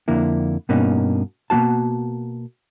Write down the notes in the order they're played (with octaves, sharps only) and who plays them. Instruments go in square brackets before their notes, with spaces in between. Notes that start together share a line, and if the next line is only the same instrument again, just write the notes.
[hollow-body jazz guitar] F2 D3 A#3 E4
G2 B2 A#3 C#4 D#4
B2 F#3 A#3 F#4 A5